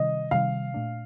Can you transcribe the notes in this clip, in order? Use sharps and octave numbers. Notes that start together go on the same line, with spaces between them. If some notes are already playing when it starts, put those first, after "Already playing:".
Already playing: C3 D#3 G3 D#5
C3 D#3 G3 F5
A#2 A3 D4